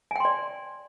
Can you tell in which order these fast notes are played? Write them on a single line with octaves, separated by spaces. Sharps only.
G#5 G5 C6 D5